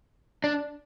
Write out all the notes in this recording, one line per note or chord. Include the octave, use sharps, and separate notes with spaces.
D4